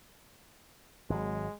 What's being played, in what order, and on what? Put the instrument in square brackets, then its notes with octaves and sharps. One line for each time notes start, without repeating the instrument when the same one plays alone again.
[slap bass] G#1 F#3 [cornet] G#3